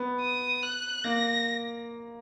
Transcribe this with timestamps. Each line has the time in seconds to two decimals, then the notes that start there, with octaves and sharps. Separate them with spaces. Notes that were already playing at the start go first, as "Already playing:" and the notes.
Already playing: B3
0.21 D#6
0.63 F#6
1.04 A#3 A#6